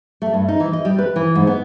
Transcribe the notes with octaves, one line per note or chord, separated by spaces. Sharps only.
A3
G2
D#4
E3
D#5
G3
B4
E3
G#2
B3